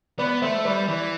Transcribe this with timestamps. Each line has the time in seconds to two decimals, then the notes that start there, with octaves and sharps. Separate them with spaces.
0.19 B3 B4 D5
0.42 A3 C5 E5
0.58 E5
0.65 G3 B4 D5
0.88 E3 B4 D5